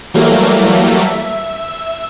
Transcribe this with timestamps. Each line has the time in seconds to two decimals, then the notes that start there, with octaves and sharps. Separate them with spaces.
0.14 E3 F#3 G3 A3 A#3
1.06 E5